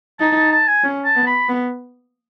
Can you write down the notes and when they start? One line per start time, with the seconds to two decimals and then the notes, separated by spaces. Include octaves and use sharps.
0.19 D#4 A5
0.35 A5
0.52 A5
0.67 G#5
0.84 C#4
1.05 A5
1.16 B3
1.26 B5
1.49 B3